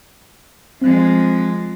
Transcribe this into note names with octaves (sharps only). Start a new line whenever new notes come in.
F3 G#3 C4 F#6